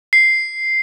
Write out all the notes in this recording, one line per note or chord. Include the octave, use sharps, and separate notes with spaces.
C7